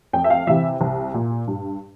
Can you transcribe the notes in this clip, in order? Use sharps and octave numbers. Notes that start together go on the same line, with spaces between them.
F2 G5
E5
F5
C3 E3 E5
C2
A#2
G2